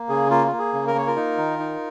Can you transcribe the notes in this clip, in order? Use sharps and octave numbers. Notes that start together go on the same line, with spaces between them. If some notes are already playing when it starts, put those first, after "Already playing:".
Already playing: A#3
C#3 G#4
A#3 F4
A#3 F4
G#4
C#3
A#4
A#3 C#5
F4 A#4
D#4
D#3
D#4